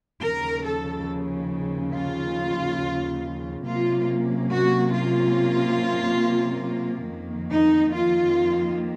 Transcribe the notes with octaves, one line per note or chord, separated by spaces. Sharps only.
D#2 C#3 F3 A#4
A4
F4
C3 F#3 A#3 C#4 F4
F#4
F4
F2 D#3 A#3
D#4
F4